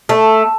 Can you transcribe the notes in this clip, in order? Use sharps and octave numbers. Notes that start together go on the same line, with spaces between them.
A3